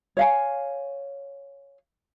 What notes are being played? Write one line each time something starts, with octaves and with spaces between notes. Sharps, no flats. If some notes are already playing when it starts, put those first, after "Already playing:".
C#5 F5 G#5